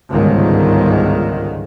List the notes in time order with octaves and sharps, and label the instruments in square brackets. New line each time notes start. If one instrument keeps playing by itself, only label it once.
[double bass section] G1 C#2 G#2 D#3